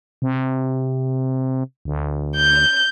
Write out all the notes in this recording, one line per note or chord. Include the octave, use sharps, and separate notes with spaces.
C3
D2
G6